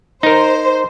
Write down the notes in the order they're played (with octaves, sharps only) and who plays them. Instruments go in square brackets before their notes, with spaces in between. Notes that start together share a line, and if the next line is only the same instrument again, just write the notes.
[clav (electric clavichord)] D#4 A#4 [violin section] C5